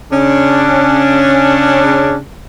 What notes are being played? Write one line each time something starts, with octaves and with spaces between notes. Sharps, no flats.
C#3 C#4 D4